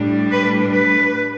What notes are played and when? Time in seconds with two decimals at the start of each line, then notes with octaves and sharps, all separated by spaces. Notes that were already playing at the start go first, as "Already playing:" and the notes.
Already playing: A2 G3 D4
0.31 B4
0.71 B4